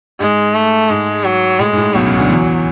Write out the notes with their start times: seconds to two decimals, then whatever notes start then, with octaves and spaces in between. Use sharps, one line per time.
0.20 G#2 G#3
0.55 A3
0.89 G#2 G#3
1.24 F#3
1.59 A2 G#3
1.73 G#2
1.77 A2
1.94 B1 B2 F#3
2.06 C#2 C#3
2.18 D2 D3
2.30 E2 E3